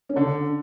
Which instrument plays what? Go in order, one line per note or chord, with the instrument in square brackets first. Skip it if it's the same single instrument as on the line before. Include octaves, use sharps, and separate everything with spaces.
[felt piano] C#4
[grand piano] D3 [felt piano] D4